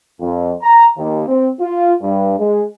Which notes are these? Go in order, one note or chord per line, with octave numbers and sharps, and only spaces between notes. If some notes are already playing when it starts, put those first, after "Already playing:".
F2
A#5
D#2
C4
F4
G2
G#3